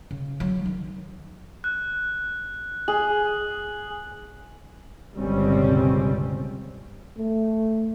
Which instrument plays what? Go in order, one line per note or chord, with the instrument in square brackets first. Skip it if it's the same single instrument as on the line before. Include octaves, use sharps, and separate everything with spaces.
[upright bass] C#3
F#3
D#3
[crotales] F#6
[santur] G#4 [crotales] F#7
[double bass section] G1 C#2 B2 G3 C4 C#4
[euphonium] A3